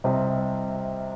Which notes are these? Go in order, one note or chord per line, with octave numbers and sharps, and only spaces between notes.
C2 C3 G3 C4 D#5